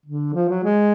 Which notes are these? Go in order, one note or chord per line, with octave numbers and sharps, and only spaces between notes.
D3
F3
F#3
G#3